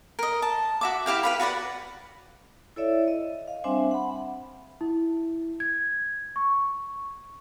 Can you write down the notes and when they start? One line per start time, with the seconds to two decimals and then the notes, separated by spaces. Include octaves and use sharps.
0.19 A#4 D#5
0.42 A5
0.81 F#4 E5 D6
1.06 E4 G4 F5 G5
1.23 B4 F5 B5
1.40 F#4 B4 D5 F#5
2.76 E4 A4 C#5 D5 E5
3.08 D#5
3.48 F5
3.64 G3 C4 D4 C5 E5 G#5
3.91 F#5 B5
4.81 E4
5.60 G#6
6.36 C#6